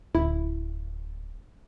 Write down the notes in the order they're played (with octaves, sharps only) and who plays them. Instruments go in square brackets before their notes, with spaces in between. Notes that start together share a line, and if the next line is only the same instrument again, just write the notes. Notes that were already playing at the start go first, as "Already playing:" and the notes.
[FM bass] D1 [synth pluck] E4